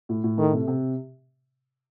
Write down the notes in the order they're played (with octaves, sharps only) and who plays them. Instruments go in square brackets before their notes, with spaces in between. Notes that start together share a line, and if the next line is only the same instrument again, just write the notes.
[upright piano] A2
A2
[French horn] D#3 [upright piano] A3
[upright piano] C3
C3